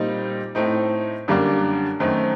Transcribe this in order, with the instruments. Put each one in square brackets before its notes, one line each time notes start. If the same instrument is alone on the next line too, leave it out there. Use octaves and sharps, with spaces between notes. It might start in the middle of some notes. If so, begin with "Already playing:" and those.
Already playing: [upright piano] A#2 G3 C4 D#4
A2 A3 C4 D#4
F#2 D3 G3 A#3 D4
F#2 D#3 A3 C4 D#4